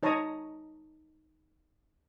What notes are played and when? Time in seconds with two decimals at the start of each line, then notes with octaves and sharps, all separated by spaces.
0.03 D#4 C#5 A5 A#5 C#6 D#6